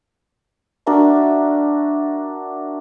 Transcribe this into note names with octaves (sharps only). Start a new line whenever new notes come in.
D4 F#4 A#4 E5